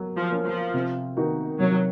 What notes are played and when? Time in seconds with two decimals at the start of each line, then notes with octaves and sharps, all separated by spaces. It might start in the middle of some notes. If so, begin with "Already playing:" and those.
Already playing: F#3 A#3
0.16 F3
0.31 A#3 C#4
0.45 F3
0.74 C3
1.17 D#3 A#3 D#4 F#4
1.60 C3 F#3